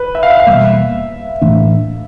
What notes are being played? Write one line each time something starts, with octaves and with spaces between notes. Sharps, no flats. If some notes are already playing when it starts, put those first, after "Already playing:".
Already playing: B4
E5
F5
E5
F5
E2 B2 G3 A#3 E5
A2 E3 A3 D4